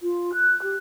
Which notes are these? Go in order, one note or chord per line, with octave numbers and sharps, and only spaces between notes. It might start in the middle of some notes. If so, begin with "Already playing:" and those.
F4
F#6
G4